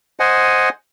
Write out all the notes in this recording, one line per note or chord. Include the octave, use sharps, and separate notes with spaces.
C5 D#5 F#5 G#5